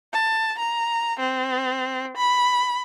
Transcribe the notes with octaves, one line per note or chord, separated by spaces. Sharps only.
A5
A#5
C4
B5